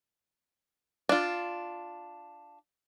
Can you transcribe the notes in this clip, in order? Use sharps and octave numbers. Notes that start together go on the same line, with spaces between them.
D4 F4